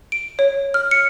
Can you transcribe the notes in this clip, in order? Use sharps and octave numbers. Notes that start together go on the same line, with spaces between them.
D7
C#5
F6
C#7